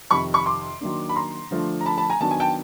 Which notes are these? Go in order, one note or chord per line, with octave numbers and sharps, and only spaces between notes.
F2 C3 D#3 B5 C#6
B5 C#6
C6 D6
D#3 F#3 A#3 D4
B5
A#5 C6
D3 F3 A3 D4 F4
A#5
A5 B5
A5 B5
G#5 A#5
D#3 F#3 B3 D4 A5
G#5
G5 A5